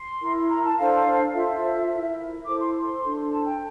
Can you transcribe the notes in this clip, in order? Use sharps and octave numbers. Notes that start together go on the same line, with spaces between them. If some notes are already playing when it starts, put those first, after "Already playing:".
Already playing: C6
E4 A#4
A#5
A5
D4 A4 C5 F5
F4 A4 C5 E5
E4 A#4
E4 A4 C5 D6
C6
C6
D4 A4 C5
A5
G5